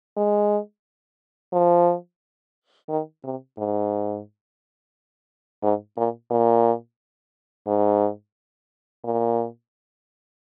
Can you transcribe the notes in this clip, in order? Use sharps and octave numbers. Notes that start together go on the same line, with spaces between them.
G#3
F3
D#3
C3
G#2
G#2
A#2
A#2
G#2
A#2